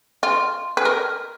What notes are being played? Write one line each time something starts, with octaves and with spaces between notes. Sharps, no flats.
F4
B4
A#4